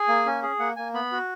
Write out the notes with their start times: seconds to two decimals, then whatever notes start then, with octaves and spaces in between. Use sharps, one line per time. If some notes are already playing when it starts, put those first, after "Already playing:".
Already playing: G#4 G#5
0.08 A#3
0.26 C#4
0.43 G#4
0.59 A#3 F#5
0.76 A#3 G#5
0.94 B3 B5
1.12 F#4